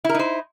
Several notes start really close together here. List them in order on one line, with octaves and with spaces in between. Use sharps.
E4 A#4 D#4 C5